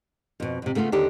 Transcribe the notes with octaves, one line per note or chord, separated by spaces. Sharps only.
F2 B2
F2 C3
C#3 A3 B3 F4
D#2 D3 D4 G4